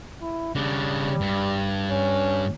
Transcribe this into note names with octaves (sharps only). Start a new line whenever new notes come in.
E4
C#3 G3 D4
G2
C#4